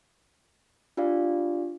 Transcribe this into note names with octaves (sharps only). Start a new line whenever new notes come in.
D4 F4 G4 D5 F5